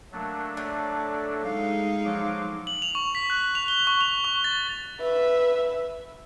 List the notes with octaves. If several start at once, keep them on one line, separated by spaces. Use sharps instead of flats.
F#3 A3 A#3 D4
A2 D5
G#3 D#4 F5
F3 F#3 D6
F#7
F7
C#6
B6
F#6
F7
G7
C#6
F7
C#6
A6
B4 E5